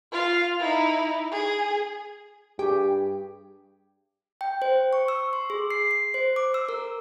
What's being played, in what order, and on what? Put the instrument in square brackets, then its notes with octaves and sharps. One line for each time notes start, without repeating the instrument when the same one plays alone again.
[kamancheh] F4 F5
D#4 E4
G#4
[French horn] G2 [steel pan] G4 [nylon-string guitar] G#4 G5
[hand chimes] G5
C5
C#6
E6
C6
G#4
C7
C7
C5
D6
E6
A#4